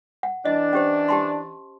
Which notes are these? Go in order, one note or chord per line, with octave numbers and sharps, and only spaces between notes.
F#5
E3 D4 D#5
C#4 G4 C5
G4 A5 C6